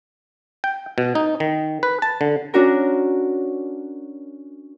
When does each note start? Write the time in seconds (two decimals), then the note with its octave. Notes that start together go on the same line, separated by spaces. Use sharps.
0.64 G5
0.98 B2
1.15 D#4
1.40 D#3
1.83 B4
2.02 A5
2.21 D3
2.54 C#4 D4 F#4 A#4